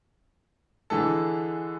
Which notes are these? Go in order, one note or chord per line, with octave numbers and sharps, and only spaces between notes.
D3 E3 G#3 A4